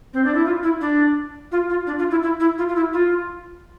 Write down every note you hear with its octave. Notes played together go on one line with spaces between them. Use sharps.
C4
D4
E4
F4
E4
D4
F4
F4
D4
F4
E4
E4
E4
F4
F4
E4
F4